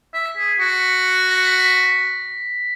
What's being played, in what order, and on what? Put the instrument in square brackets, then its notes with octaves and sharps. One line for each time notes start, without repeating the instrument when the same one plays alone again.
[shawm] E5
[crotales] B6
[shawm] G#4
[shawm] F#4 [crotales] B6
[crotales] A#6
B6
B6